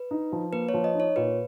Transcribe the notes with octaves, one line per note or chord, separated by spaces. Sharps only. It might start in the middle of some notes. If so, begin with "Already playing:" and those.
Already playing: B4
D#4
F3
A#3 B4
C#5
F3
D#5
D#4
C#5
A#2 B4